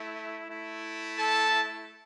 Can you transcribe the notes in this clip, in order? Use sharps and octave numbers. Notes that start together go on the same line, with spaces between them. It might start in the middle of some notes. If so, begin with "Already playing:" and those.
Already playing: A3 E4
A3 E4
A4 A5